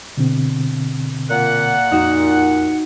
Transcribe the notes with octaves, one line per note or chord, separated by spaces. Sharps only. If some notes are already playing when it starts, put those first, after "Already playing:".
B2 D3 C4
A#2 F#5
F2 D#4 F#4